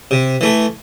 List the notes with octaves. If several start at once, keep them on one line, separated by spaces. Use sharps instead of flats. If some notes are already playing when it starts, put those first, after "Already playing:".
C3
E3 A3